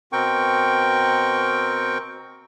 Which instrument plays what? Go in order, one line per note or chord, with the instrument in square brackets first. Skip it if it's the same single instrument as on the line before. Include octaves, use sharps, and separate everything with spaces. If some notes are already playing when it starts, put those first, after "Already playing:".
[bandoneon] B2 C4 A#4 G5 C#6